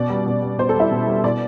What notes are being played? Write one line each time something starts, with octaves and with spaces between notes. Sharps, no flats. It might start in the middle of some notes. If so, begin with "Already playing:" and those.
Already playing: B2 D5
G3
B2
G3
B2 C5
A4
G3
E4
B2
G3
B2 D5